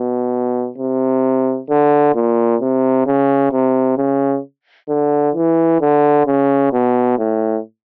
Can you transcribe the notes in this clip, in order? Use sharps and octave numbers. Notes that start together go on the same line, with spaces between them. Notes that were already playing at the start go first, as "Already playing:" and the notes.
Already playing: B2
C3
D3
A#2
C3
C#3
C3
C#3
D3
E3
D3
C#3
B2
A2